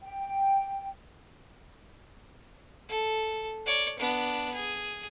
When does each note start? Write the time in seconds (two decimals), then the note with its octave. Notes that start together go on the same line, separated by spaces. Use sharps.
0.02 G5
2.89 A4
3.66 C#5 D5
3.99 B3 D4
4.54 G#4